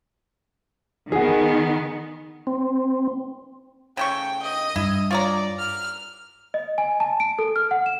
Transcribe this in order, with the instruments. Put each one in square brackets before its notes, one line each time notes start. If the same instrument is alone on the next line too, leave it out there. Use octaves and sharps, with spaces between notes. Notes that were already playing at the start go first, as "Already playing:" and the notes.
[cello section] D#3 B3 [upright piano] G#4 F#5
[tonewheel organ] C4
[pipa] C#3 A3 C#6 [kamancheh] G5
[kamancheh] D#5
[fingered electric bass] G2 [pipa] E4
[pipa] F4 C#5 A#5 [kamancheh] D5
[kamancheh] F6
[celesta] D#5
G#5
A5
D7
A4
F6
F#5
E7